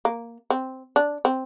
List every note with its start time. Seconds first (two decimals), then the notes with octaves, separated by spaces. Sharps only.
0.05 A#3
0.50 C4
0.96 D4
1.25 C4